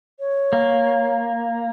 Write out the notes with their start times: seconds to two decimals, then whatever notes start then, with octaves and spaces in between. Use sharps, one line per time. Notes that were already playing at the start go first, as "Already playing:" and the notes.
0.20 C#5
0.53 A#3